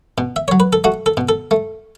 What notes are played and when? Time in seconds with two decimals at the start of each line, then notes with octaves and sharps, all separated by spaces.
0.18 B2
0.36 E5
0.48 F#3 C#5
0.60 B4
0.73 A4
0.84 A3 F#4
1.06 A4
1.17 B2
1.29 A4
1.51 A3